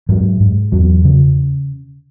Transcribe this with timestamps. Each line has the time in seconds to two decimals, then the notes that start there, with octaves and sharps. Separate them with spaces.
0.09 G#2 F#3
0.40 G#2
0.72 E2 F#3
1.04 C#3